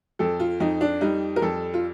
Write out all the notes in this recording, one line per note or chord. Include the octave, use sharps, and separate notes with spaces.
F2 A4
F4
F2 D#4
D4
G3 D#4
A#4
F2 A4
F4